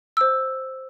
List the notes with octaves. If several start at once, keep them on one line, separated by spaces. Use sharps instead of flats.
C5 E6